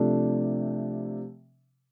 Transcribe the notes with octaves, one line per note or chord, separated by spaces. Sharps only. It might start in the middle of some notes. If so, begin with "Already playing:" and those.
Already playing: C3 F3 A3 D4